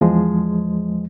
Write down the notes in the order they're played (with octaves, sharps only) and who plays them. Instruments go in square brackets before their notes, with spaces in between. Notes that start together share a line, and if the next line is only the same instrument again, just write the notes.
[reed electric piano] E2 F3 G#3